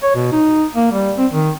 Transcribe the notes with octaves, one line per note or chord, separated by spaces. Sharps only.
C#5
B2
D#4
A#3
G3
C4
D#3